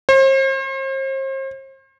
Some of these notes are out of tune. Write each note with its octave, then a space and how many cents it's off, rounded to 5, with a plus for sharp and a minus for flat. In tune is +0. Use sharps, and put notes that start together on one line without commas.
C5 +40